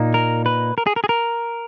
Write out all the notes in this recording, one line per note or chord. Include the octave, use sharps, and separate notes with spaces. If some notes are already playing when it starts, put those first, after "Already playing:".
Already playing: A#2 A#3 D#4
A#4
B4
A#4
G#4
A#4
G#4
A#4